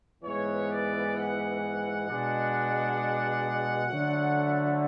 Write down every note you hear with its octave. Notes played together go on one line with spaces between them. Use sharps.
G#2 E3 B3 C#5
D5
F#5
B2 G#3 D4
D3 F#3 A3